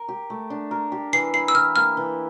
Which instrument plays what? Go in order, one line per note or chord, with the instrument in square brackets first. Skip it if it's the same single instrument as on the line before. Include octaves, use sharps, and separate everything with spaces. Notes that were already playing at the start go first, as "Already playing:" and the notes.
Already playing: [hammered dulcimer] A#4
G4
A3
D4
A#4
G4
[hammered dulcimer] E3 [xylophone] C7
[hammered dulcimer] E4 [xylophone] C7
[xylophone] E6
[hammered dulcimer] E3 [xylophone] F6
[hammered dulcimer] A#3 [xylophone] F6
[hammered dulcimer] E3